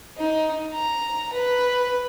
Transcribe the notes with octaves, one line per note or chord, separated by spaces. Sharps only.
D#4
A#5
B4